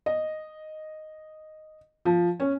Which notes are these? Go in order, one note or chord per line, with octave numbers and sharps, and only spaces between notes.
D#5
F3
C#4